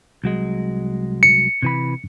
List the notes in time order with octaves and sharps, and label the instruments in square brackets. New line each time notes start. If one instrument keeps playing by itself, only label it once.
[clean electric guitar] C2 F#3 G#3
[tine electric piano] C#7
[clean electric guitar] C3 E3 B5